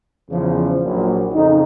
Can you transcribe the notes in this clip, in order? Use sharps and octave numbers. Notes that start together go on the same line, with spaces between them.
E2 C#3 F3
A#1 A#2 F#3
F2 C#3 D#4